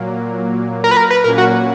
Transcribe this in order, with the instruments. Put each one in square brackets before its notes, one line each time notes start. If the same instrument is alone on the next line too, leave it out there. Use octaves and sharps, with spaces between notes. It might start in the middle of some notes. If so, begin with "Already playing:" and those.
Already playing: [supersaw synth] A#2 F#3 A#3
[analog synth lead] A#4
B4
A#4
B4
[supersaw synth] A#2 F#3 A#3 C#4 [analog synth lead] A#4
[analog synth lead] F#4